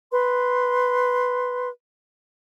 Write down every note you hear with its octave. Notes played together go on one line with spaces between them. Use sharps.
B4 C6